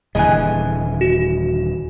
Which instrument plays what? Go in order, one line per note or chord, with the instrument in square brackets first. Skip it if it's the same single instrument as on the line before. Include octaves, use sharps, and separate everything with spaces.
[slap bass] D#1 D3 E3 [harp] G#4 G#5 [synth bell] D#5 F#6
[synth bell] F#4